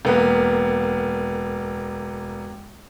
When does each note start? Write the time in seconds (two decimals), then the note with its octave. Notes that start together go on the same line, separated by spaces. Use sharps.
0.05 E1 A#3 B3